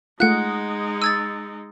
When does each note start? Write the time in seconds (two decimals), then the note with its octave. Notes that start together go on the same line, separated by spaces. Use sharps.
0.20 G#3 A3 D#4 F4 F#5 F#6
1.02 D#6 E6 G#6 A6